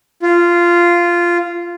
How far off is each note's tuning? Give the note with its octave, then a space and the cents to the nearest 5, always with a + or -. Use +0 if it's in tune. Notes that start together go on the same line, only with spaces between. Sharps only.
F4 -10